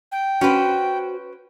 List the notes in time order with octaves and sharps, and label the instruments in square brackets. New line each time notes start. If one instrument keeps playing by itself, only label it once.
[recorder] G5
[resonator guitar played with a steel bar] C#4 B4 [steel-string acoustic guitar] F#4 C5